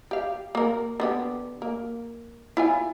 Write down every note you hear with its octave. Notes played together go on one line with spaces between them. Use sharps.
G4 F5
A#3 A#4
D3 B3 G4
A#3
E4 F4 G#5